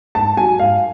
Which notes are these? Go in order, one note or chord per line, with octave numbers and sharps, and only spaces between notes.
G#2 A5
F#3 G#5
G#2 F5